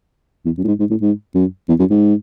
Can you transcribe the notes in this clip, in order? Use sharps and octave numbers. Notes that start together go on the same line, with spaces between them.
E2
F#2
A2
G#2
G#2
A2
G#2
F#2
E2
F#2
G#2